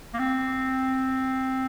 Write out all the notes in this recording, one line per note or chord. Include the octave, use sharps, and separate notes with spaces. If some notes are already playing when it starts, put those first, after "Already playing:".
A#3
C4